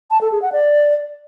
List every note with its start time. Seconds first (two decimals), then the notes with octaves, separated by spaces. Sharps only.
0.11 A5
0.21 A4
0.31 G#4
0.42 F#5
0.52 D5